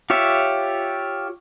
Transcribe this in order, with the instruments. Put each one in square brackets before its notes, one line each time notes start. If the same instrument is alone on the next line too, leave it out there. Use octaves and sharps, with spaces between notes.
[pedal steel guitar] F4 G4 C#5 E5